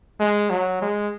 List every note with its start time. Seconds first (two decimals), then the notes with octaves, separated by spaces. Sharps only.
0.20 G#3
0.50 F#3
0.82 G#3